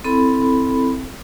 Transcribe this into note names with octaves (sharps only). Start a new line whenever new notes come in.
C4 E4 A4 B5